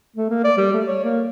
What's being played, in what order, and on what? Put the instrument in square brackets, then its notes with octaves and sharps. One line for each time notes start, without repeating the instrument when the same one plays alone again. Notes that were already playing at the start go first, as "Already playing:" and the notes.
[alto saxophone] A3
A#3
D5
G3
A3
C#5
A#3